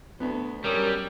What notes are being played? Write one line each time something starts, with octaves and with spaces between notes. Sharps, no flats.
D2 B3
F#2 G3 A#4